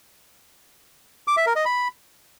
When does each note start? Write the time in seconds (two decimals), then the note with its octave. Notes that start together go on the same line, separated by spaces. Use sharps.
1.28 D6
1.37 E5
1.46 A#4
1.56 D#5
1.65 B5